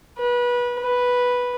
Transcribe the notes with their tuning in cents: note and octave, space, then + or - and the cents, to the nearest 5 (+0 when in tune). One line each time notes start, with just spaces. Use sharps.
B4 -25
B4 -5